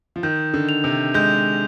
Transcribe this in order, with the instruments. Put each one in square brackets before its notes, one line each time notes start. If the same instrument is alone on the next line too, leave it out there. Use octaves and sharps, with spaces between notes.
[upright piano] F3
[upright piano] D#3 [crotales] G6
[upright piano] D3
[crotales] F7
[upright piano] C3
[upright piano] G#3 [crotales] G6